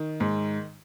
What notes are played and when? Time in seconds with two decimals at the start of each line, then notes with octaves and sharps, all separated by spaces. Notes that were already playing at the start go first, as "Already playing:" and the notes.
Already playing: D#3
0.20 G#2